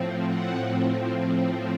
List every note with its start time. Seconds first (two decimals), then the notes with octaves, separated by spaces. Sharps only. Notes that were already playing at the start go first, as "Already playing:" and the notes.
Already playing: A2 F3 C4
0.23 F#5